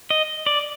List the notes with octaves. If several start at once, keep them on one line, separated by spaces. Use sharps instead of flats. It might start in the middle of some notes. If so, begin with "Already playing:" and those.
D#5
D5